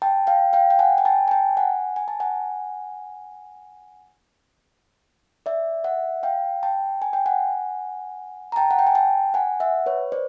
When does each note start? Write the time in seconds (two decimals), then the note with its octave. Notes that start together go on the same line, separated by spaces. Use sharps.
0.02 G5 A5
0.27 F5 G5
0.53 F5 G5
0.70 G5
0.79 F#5 G#5
0.98 G#5
1.05 G5 A5
1.28 G#5
1.31 G5 A5
1.57 F#5 G#5
1.96 G#5
2.08 A5
2.20 F#5 G#5
5.46 D5 E5
5.84 E5 F#5
6.23 F5 G5
6.63 G5 A5
7.02 G#5
7.13 G5
7.26 F#5 G#5
8.52 A#5
8.56 G5 A5
8.71 F#5
8.79 G5
8.87 G#5
8.95 G5 A5
9.34 F#5 G#5
9.60 E5 F#5
9.86 B4 C#5
10.12 C5 D5